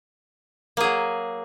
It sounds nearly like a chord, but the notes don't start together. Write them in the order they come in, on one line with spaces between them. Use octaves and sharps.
A#3 G#4 F#3